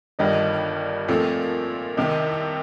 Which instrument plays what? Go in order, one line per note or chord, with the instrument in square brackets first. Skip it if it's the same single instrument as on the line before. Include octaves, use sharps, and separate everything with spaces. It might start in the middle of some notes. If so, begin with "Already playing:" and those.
[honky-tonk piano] G1 G2 D#3 G3 [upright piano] D#5
[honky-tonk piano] A#2 F3 A3 C4
[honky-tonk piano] C2 C3 D#3 [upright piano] D#5